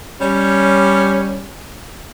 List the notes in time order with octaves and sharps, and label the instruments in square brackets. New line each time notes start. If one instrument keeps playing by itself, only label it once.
[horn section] G3 C#4